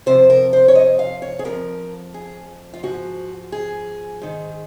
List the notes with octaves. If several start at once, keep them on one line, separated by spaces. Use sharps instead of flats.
F2 C3 F3 C5
A#4
C5
C#5
D#5
F5
C#5
G#4
F2 C#3 F3 A#4
G#4
F4
G#2 F3 F#4
G#4
G#2 D#3